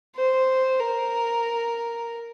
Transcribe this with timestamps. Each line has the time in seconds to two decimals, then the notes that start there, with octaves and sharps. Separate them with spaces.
0.16 C5
0.80 A#4